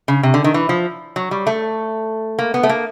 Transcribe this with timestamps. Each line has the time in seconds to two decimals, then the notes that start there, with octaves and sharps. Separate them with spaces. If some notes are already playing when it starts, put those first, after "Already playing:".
0.08 C#3
0.23 C3
0.34 D3
0.44 D#3
0.54 E3
0.69 F3
1.16 F#3
1.31 G3
1.47 A3
2.39 A#3
2.54 B3
2.63 A3
2.69 A#3